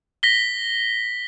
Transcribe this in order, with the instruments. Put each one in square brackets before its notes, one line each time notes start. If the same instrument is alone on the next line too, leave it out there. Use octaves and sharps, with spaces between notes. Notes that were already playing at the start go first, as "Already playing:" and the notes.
[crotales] A#6 B6 G7